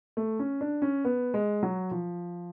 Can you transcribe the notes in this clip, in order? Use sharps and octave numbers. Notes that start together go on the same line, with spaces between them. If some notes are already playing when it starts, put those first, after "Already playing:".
A3
C#4
D4
C#4
B3
G#3
F#3
F3